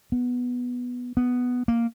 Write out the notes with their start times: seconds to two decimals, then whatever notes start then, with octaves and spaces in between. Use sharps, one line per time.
0.12 B3
1.17 B3
1.68 A#3